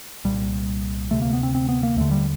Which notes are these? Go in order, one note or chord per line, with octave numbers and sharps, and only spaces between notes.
C2 A#2 G3
D2 C3 A3
A#3
B3
C4
C4
B3
A#3
D#2 D3 A3
G3